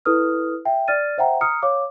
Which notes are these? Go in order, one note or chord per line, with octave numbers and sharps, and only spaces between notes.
E4 A4 B4 D#6 F6
E5 G5
D5 F6 A6 D#7
C5 E5 F#5 G5 A#5
A#5 D#6 F6 C#7
C#5 F5 D6